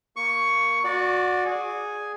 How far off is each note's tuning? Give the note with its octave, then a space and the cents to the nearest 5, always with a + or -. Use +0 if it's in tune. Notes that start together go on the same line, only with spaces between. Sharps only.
A#3 +0 C#6 +10
F#4 -25 D5 +0
G#4 +0 G#5 +0